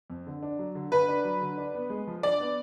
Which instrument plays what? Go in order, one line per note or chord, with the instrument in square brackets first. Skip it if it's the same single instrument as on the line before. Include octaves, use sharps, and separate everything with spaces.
[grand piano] F2
D3
D4
F#3
D3
[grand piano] D3 [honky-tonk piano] B4
[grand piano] D4
F#3
D3
D4
B3
G#3
F3
[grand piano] D4 [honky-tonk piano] D5
[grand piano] B3